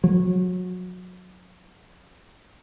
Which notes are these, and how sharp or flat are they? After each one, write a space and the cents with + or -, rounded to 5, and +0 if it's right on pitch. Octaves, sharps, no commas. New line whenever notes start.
F#3 -25